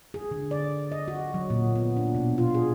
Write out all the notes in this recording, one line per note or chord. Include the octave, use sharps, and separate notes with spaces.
G#4
D3
D5
D#5
F#4
F#3
A#2
B3
D4
B2
F4
G#4